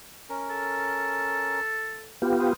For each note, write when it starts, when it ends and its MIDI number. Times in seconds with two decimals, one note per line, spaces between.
0.30 1.60 61
0.30 1.60 70
0.50 2.14 69
2.22 2.53 59
2.22 2.53 65
2.22 2.53 67
2.39 2.54 71
2.39 2.54 72
2.39 2.54 87